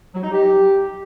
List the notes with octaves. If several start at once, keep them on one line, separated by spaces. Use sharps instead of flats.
F#3
D#4
G4